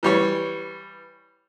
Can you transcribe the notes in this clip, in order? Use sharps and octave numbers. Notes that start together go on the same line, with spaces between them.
E3 G3 C#5